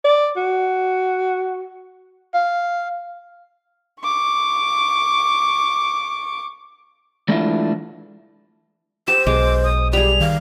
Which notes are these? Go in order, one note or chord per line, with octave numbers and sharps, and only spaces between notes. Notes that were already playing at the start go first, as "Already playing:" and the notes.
D5
F#4
F5
C#6 D6
E3 G#3 A3 D4 E4 F4
G4 C5 E7
B1 G#3 D6
D#6
G3 G4 G#4 F7
D#3 F5